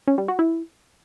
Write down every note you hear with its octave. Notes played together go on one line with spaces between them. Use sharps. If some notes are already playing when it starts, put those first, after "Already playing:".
C#4
G3
F#4
E4